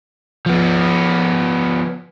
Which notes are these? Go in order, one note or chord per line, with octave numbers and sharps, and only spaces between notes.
F3 B3